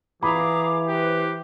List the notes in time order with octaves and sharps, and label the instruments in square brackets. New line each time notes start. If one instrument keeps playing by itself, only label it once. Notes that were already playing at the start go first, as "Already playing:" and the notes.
[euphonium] E3 [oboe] G#4 [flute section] F5 A#5 D6 [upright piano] B5
[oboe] G4 [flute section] B4 C5